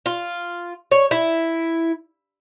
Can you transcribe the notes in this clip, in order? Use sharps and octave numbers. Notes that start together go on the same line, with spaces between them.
F4
C#5
E4